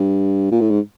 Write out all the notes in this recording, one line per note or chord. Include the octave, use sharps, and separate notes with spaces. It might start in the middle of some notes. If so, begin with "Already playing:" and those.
Already playing: G2
A#2
A2
G#2